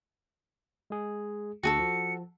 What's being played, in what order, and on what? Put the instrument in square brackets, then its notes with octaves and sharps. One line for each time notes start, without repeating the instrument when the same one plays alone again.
[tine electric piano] G#3 G#4
[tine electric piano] D2 D4 [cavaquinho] F#4 G#4 A4 [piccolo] C#7
[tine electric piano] F3